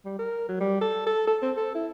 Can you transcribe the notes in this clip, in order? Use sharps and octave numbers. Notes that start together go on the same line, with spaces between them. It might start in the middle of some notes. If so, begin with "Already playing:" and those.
G3
A#4
F#3
G3
A4
A4
A4
C4
A4
E4